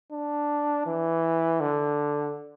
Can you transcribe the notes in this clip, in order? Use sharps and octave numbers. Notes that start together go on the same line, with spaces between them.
D4
E3
D3